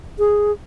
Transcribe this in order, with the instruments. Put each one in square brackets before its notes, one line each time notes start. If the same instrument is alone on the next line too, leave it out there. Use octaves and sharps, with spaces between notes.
[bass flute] G#4